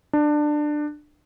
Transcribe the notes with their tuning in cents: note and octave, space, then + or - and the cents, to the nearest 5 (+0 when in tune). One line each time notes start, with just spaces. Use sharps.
D4 +20